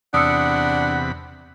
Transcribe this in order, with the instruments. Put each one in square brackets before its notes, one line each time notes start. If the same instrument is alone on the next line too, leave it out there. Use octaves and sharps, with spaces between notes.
[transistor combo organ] E2 C3 B5 [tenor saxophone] D4 [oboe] F#5 [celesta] D#6 E6 C#7